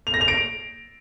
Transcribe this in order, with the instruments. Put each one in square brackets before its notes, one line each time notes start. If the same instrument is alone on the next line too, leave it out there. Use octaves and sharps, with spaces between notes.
[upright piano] F7
A#6
F7
D7